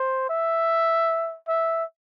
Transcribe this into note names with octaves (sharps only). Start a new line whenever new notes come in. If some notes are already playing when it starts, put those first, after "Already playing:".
Already playing: C5
E5
E5